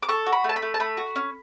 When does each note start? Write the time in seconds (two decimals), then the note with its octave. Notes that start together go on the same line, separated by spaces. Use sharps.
0.03 D6
0.09 A4 C#6
0.26 F#4
0.33 B5
0.44 A3
0.49 A5
0.56 B5
0.62 A3
0.74 A5
0.80 A3 B5
0.97 F#4
1.16 C#4